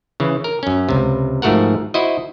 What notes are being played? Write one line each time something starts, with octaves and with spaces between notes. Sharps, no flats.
C#3 E3
A#4
F#2 C#4
C#2 C3
G#2 F3 A3 F#4 A#4 F#5
E4 F#4 C5 D#5